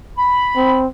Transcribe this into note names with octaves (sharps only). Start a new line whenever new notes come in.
B5
C4